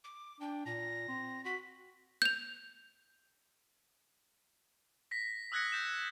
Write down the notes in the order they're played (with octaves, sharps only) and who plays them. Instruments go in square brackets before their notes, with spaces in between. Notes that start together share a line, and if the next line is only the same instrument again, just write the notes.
[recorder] D6
[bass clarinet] D4 [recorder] G5
[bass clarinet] A#2 [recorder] A#6
[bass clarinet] C4
[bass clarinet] F#4 [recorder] B6
[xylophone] G6 F7
[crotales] A#6 B6
D#6 E6 F#6 G#6 A#6 C#7
G6 A6 E7